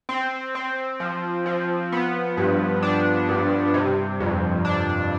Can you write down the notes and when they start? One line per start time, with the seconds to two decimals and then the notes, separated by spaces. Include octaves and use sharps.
0.09 C4
0.55 C4
1.00 F3
1.46 F3
1.92 B3
2.37 G2
2.83 D4
3.29 G2
3.74 C3
4.20 F2
4.65 D4